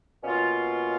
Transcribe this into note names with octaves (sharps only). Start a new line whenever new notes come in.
B2 A#3 C#4 F4